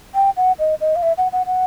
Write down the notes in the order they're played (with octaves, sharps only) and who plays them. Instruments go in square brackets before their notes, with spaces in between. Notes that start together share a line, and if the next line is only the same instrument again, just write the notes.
[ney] G5
F#5
D#5
D#5
F5
E5
F#5
F#5
F#5